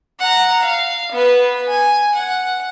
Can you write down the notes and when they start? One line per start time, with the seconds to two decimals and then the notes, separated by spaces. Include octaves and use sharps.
0.20 F#5 A#5
0.62 F5
1.12 B3 B4
1.68 G#5
2.14 F#5